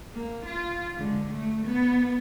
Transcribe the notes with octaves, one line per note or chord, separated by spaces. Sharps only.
A#3
F4
D3 G#3
A3
B3